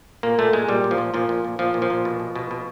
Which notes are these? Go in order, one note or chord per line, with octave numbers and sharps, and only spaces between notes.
A#2 A#3
A#2 A3
A#2 G#3
A#2 G3
A#2
F3
A#2
A#2 F3
A#2
A#2
A#2 F3
A#2
F3
A#2
B2
B2
B2
B2